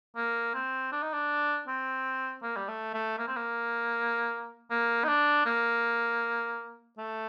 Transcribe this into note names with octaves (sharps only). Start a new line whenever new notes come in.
A#3
C4
D4
D#4
D4
C4
A#3
G3
A3
A3
A#3
C4
A#3
A#3
D#4
D4
A#3
A3